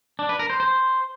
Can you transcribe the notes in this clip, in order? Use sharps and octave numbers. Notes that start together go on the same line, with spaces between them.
D4
B4
A#4
C5
C5